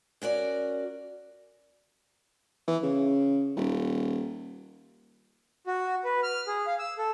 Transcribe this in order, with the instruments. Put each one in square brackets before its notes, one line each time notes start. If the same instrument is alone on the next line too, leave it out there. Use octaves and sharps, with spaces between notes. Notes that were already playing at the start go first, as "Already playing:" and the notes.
[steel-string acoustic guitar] C#4 F#4 A#4 D5
[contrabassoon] E3
C#3
D#1
[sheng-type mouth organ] F#4
B4
F6
G#4
F5
E6
A4